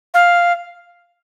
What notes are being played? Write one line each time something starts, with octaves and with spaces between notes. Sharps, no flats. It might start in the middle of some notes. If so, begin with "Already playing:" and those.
F5